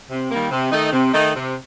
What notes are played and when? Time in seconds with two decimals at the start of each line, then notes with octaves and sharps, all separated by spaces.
0.10 C3
0.31 D#3 G3 A#3
0.51 C3
0.72 D#3 A3 D#4
0.92 C3
1.13 D#3 A3 D#4
1.34 C3